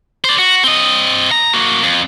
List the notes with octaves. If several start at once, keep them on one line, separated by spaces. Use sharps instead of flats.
C5 D5
F#4
C4 D#5
A#5
A#3 F#4
F2